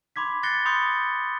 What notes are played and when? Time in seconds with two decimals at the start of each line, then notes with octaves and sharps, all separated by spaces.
0.16 B5 C6 D6 G#6 B6
0.43 F#6 A6 A#6 C7 C#7 G7
0.65 B5 C6 D#6 G6 C#7